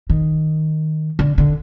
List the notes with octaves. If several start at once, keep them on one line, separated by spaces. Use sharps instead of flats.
D#3
D3
D3